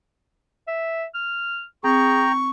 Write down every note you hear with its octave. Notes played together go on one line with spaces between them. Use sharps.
E5
F6
C4 G#4 G5 A#5 C#6